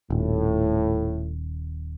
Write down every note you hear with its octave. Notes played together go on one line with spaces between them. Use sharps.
D#1 A2